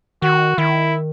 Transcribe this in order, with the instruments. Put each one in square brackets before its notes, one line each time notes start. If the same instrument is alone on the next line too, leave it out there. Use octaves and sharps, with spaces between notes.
[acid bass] D#3 [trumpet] F#4
[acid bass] D#3 [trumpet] E4